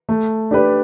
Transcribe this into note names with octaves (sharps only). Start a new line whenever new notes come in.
A3
D4 G4 B4 D5